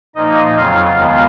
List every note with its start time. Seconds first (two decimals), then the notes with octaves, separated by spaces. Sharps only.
0.15 A#2 F3 A#3 D#4 D#5
0.56 F2 C#3 F#3 F4 F5
0.96 D#2 D#3 G#3 B3